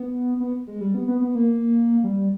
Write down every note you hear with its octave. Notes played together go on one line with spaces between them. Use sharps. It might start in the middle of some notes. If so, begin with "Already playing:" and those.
Already playing: B3
B3
G#3
G3
B3
B3
B3
A#3
G3